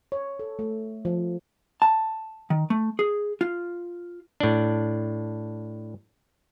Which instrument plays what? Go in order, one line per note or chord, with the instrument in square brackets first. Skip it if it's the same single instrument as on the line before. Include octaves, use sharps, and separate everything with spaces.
[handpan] C#5
A4
A3
F3
[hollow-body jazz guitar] A5
D#3
A3
G#4
F4
[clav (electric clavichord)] A2 D4